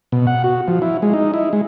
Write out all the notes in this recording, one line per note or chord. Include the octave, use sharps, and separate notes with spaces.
B2
F#5
F#4
F3
E4
G#3
D#4
E4
G#3